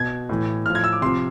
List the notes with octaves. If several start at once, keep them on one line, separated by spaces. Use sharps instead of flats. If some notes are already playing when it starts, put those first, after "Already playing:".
Already playing: B2 G#6
A2 E3
A2 F3 F6
G#6
E6
D6
C3 F3 C6